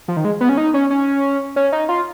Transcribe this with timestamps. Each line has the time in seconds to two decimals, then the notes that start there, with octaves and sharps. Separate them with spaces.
0.08 F3
0.17 D#3
0.25 G#3
0.41 B3
0.49 C#4
0.57 D#4
0.74 C#4
0.90 C#4
1.56 C#4
1.72 D#4
1.89 F4